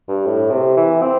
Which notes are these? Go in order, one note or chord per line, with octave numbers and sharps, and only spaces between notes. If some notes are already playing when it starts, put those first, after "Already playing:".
G2
A2
C3
E3
C4